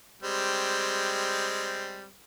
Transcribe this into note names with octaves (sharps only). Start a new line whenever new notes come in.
G3 G#3 C4